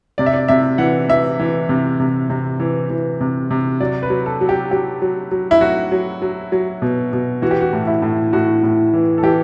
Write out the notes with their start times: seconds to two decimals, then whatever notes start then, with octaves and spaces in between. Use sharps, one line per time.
0.18 C3 D5
0.26 E5
0.33 D5
0.48 C3 E5
0.78 E3 F#5
1.08 E3 E5
1.39 E3
1.69 C3
2.00 C3
2.30 C3
2.60 E3
2.90 E3
3.21 C3
3.51 C3
3.80 F#3 D5
4.02 B4
4.10 F#3
4.26 A4
4.41 F#3
4.49 G4
4.71 F#3 G4
5.02 F#3
5.32 F#3
5.51 E4
5.61 F#3 F#4
5.92 F#3
6.22 F#3
6.52 F#3
6.82 B2
7.13 B2
7.42 E3 F#4
7.51 G4
7.61 F#4
7.73 A2
7.87 E4
8.02 A2
8.33 A2 F#4
8.63 A2
8.93 E3
9.18 A4
9.23 E3 G4